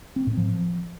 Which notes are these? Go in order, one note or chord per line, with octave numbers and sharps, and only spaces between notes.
C4
A2
F3